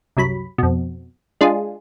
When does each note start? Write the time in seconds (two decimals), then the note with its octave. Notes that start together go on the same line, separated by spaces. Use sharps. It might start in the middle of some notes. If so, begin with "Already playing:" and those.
0.17 C2 F#2 F#3 B5
0.58 F2 B2
1.41 G#3 D4 F4 G#4